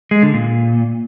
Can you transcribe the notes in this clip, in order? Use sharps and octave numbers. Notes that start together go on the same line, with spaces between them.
G#3
D3
A#2